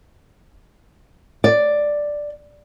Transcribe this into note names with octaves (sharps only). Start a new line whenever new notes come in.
D5